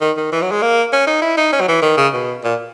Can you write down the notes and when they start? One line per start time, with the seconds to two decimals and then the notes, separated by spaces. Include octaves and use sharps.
0.01 D#3
0.17 D#3
0.32 E3
0.42 F#3
0.52 G#3
0.62 A#3
0.93 C#4
1.07 D#4
1.22 E4
1.37 D#4
1.53 C#4
1.61 F#3
1.68 E3
1.82 D#3
1.97 C#3
2.14 B2
2.44 A#2